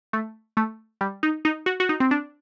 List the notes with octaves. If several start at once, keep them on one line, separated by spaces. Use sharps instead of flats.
A3
A3
G3
D#4
D#4
F#4
F#4
D#4
C4
D4